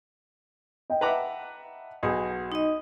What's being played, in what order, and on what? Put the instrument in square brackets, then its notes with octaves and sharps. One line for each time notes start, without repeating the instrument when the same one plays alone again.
[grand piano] D#5 G5
[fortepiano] B4 A#5 D6 [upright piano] E5 F#5 A5
[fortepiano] B1 G#4 [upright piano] F#4 G#5 D#6
[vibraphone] D#4 D#5